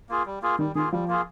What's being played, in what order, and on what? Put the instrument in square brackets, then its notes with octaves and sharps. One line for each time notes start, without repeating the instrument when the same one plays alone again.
[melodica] A#3 F4 G#4
G3
A#3 F4 G#4
[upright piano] D#3 [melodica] G3
[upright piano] D#3 [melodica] A#3 F4 G#4
[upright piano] F3 [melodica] G3
[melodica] A#3 F4 G#4